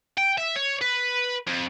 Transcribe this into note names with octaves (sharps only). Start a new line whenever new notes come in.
G5
E5
C#5
B4
F2